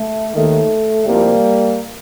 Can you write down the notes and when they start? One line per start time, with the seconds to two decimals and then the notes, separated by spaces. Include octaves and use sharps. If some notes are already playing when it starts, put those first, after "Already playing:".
Already playing: A3
0.34 D#2 D#3 A3
1.05 C2 C3 F3 G3 A#3